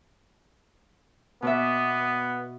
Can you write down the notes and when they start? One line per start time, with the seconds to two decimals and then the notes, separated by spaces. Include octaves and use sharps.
1.42 B2 B3 D5 E5